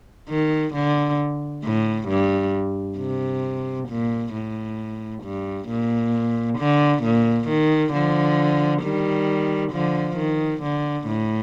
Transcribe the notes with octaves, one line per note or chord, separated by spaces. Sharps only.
D#3
D3
A2
G2
C3
A#2
A2
G2
A#2
D3
A#2
D#3
D3 F3
D#3 G3
D3 F3
D#3
D3
A2